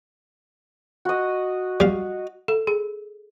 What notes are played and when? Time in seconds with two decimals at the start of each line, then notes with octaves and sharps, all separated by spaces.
1.05 F#4 D#5
1.80 G3 F5
2.48 A4
2.67 G#4